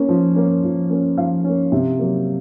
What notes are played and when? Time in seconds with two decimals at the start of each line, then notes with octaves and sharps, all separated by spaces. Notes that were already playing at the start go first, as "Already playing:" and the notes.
Already playing: A#3 C#4
0.09 F3
0.35 A#3 C#4
0.63 F3
0.90 A#3 C#4
1.17 F3 F5
1.44 A#3 C#4
1.72 C3
1.99 F#3 A#3